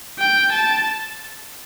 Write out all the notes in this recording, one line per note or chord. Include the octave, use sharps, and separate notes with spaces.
G5
A5